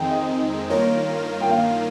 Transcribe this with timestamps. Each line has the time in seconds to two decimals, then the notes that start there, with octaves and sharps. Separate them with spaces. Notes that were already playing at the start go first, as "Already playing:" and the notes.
Already playing: F2 D#3 G#3 C4 D#4 G5
0.10 D#5
0.70 G2 D#3 A#3 F4 A#4 C#5
1.41 G5
1.51 F5